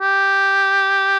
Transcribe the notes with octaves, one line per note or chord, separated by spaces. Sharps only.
G4